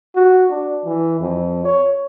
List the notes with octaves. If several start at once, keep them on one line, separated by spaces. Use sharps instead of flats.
F#4
D4
E3
F2
C#5